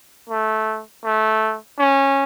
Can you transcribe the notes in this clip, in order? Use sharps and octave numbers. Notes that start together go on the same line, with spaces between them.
A3
A3
C#4